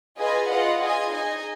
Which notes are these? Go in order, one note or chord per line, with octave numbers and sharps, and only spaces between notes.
F4 G#4 B4 D#5 G#5
F4 B4 D#5 F#5
F4 G#4 D#5 G#5
D#4 G#4 D#5 G#5